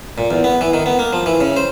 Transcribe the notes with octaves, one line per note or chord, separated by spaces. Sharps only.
A#2
E2
B3
E3
D#3
B3
A#3
F3
E3
C#3
C5